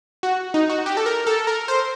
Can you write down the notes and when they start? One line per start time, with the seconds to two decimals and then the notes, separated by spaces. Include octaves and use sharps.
0.23 F#4
0.54 D#4
0.70 F#4
0.86 G4
0.97 A4
1.06 A#4
1.27 A4
1.47 A#4
1.68 C5